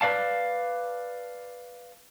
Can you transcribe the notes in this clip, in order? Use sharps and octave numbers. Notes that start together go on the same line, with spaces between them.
B4 D5 F5 A5